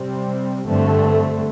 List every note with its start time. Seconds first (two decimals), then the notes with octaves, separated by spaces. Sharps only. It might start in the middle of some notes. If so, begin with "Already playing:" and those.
Already playing: C3 G3 C4
0.67 G2 D3 A3 C4